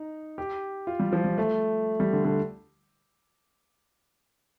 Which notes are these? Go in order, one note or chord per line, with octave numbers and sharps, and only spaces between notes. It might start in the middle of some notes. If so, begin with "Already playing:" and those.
Already playing: D#4
G4
F4
G3
F3
G3
A3
G3
D3
D3